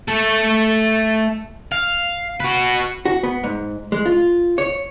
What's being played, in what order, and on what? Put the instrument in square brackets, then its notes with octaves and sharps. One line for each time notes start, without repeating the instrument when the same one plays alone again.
[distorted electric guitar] A3 A4
F5
F#4 B4
[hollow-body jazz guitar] F#4
B3
G#2
G#3
F4
C#5